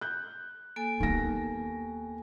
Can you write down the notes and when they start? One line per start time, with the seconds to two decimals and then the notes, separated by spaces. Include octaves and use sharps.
0.01 F#6 G6
0.76 A#3 A4 G#5
1.00 D#2 B3 D#4 A#6